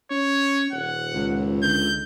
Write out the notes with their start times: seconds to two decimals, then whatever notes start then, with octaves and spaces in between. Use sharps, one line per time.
0.11 C#4 C#5
0.72 D#1 F#5
1.14 C#2
1.63 D3 G6